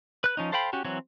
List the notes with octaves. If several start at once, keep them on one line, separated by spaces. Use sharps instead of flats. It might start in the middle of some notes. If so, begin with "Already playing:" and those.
B4 F#6
F3 C#4 D#4
A4 C5 F5 G5 B5
C#4 F#4 G4
E3 F#3 C4 C#5